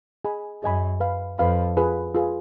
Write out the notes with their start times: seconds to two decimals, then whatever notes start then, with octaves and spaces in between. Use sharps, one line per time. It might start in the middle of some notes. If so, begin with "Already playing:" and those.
0.25 G#4 D#5 G#5 B5
0.63 F#2 G#4 D#5 G#5 B5
1.00 B4 F5 B5
1.38 F2 B4 F5 B5
1.77 F4 G#4 B4
2.15 F4 G#4 B4